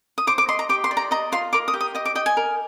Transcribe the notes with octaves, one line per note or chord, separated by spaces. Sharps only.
D#6
C5 D6
D6
D#5 C6
A#5
G4 D6
C6
D5
A#5
D#5 A#5
F4 C6
A#4 D6
D#6
G4
D#6
D#5 D#6
D6
D#5 G5
G#5
A#4